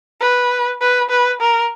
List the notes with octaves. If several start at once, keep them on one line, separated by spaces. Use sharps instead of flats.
B4
B4
B4
A#4